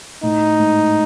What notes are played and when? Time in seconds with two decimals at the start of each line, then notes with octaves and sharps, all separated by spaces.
0.23 A2 D#4
0.59 G#2